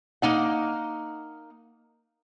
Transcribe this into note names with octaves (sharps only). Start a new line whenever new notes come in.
A#3 D#4 F#5